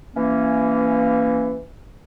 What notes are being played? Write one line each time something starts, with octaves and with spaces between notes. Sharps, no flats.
E3 A#3 C#4